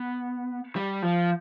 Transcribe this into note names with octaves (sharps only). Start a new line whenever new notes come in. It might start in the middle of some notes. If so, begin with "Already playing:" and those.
Already playing: B3
G3
F3